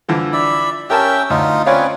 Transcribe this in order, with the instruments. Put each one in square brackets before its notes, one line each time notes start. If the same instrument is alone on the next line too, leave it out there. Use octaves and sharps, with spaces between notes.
[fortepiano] D3 E3 F3
[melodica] D5 E5 B5
[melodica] C#4 E5 G5 [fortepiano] G4 A#4 A5
[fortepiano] D2 [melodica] D#4 F4
[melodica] C4 C#4 B4 [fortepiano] F4 C#5 D5